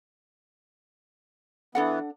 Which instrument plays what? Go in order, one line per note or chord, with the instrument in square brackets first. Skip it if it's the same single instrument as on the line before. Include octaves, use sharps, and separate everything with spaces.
[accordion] E3 B3 [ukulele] D4 A4 F#5